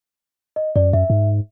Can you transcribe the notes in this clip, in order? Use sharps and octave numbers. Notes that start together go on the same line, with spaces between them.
D#5
F#2 D5
F#2 E5
G#2